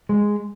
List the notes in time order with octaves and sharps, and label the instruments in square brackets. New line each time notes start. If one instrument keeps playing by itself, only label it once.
[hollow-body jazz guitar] G#3